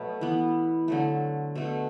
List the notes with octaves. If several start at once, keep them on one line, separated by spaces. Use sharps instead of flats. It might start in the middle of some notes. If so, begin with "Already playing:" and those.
Already playing: B2 F#3 A3 B4
E3 B3
D3 F#3 A3
B2 A3